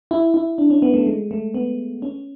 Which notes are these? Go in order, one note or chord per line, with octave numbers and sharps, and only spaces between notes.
E4
E4
D4
C#4
B3
A3
G#3
A3
B3
C#4